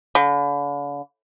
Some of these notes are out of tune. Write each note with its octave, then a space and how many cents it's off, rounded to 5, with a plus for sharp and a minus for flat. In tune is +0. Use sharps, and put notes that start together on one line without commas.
D3 -45